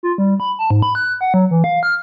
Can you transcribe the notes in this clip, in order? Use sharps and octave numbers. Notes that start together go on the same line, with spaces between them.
F4
G3
B5
A5
G#2
B5
F#6
F#5
F#3
E3
F5
F6